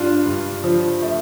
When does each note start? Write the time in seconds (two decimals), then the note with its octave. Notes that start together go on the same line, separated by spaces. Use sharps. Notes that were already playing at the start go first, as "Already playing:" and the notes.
Already playing: G2 D4 F4
0.26 G2
0.64 F3
1.02 A3